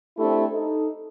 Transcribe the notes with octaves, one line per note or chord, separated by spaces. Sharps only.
A3 C4 D4 E4 G4
D#4 A4